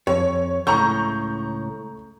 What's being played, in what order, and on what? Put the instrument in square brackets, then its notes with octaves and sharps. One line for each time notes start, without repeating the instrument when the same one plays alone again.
[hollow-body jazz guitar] F2 [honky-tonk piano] C#5
[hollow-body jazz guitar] C#2 A2 [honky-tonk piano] A#5 C#6 G6